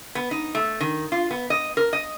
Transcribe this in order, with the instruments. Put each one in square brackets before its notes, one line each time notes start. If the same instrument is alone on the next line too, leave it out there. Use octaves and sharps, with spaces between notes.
[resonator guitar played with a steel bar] B3
D#4
A3
D#3
F4
B3
D#5
A#4
D#5